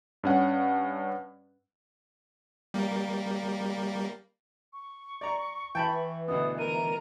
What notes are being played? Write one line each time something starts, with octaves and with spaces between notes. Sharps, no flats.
G2 C#4 F#5
G3 A#3
C#6
D5 A#5
E3 G5 A5 B5
D2 B2 B3 D#6
A#4 A#5 D#7